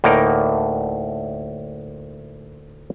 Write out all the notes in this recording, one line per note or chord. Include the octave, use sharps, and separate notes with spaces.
D2 A2 A#3 D#4 A#4 G5